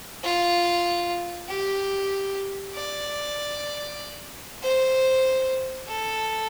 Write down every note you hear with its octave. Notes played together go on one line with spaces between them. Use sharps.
F4
G4
D5
C5
A4